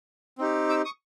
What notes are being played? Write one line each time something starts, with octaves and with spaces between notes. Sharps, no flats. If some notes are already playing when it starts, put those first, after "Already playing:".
C4 D#4 G4
D6 E6
C#6 D#6